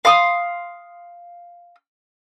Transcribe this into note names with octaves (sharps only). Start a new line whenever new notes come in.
F5 C6 D6 D#6